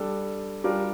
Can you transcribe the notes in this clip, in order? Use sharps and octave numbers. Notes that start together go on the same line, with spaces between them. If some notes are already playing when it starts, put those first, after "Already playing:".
Already playing: G3 D4 A4
G3 D4 F4 A#4